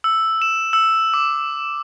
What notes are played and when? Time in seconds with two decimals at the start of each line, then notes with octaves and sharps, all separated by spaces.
0.04 E6
0.42 E7
0.73 E6
1.14 D6